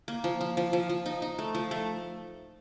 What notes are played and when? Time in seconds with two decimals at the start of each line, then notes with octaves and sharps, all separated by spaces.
0.08 A#3
0.24 F3
0.41 F3
0.57 F3
0.73 F3
0.89 F3
1.06 D#4
1.22 D#4
1.39 A3
1.55 F3
1.71 A3